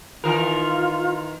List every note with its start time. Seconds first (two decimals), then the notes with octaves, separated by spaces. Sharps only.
0.24 D#3 E3 F4 A#4